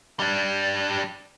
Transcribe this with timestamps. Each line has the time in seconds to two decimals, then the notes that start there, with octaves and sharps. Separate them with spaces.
0.20 G3 D4